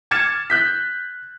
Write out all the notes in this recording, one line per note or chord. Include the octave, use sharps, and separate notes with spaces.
D6 F6 G#6 A6 C#7 E7
F#6 G6 B6